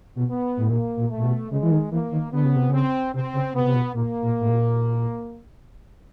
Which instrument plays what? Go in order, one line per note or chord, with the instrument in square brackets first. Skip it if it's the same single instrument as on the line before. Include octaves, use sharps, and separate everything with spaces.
[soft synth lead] B2
[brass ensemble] B3
[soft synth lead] A2
[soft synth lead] A#2 [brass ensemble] A#3
[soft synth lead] A#2
[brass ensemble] A3
[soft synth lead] A#2
B2
[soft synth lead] C#3 [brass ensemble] G#3
[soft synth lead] E3
D#3
[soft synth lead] E3 [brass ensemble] A#3
[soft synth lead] D#3
[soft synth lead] D3 [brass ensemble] B3
[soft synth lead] C#3
C3
[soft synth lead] C#3 [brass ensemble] C4
[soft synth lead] C3 [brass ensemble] C4
[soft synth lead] C#3
[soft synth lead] C3 [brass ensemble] B3
[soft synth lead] C3
B2
[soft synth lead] A#2 [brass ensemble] A#3
[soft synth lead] A#2
A2
A#2